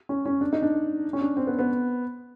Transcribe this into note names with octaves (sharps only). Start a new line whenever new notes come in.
C#4
C#4
D4
D#4
D4
C#4
D4
C4
B3
B3